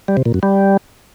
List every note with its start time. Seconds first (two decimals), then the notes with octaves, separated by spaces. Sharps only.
0.08 G3
0.17 C3
0.26 A#2
0.34 F#2
0.43 G3